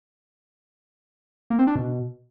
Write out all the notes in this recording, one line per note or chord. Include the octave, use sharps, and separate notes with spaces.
A#3
C4
D4
B2